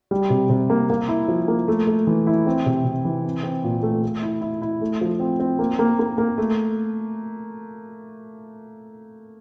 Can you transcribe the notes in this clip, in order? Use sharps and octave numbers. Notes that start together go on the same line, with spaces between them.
G3
C3
C3
A#3
A#3
E4
F3
A#3
A3
A3
E3
E4
C4
C3
C3
E3
C4
C4
A#2
A3
A3
E4
E4
E4
A3
F3
C4
C4
A#3
A#3
A#3
A#3
A3